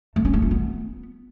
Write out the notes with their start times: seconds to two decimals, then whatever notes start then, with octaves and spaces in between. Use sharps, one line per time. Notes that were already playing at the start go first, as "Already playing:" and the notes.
0.16 A3
0.25 C#4
0.33 A3
0.42 F4
0.51 B3